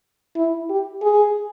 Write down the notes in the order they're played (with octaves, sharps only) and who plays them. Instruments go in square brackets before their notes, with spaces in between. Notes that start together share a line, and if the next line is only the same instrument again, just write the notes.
[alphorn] E4
G4
G#4